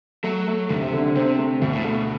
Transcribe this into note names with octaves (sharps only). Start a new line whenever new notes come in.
F#3 A3
A3
D2 C3
D3
C3 C4
A3
D2 B2
A2
B2 A3